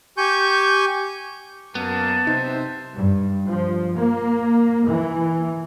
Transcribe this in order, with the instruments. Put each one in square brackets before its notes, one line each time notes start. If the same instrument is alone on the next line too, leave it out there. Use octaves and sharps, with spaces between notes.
[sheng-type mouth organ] G4 G#5 C#6 G6
[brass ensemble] F#2 A#3 [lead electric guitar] B3 [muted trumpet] A5
[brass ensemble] C3 C5 E5 [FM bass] D#4
[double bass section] G2
F3
A#3
E3